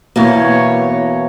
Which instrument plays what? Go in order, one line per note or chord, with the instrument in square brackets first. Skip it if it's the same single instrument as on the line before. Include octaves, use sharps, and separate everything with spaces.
[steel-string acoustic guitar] E2 B2 A#3 [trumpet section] C#5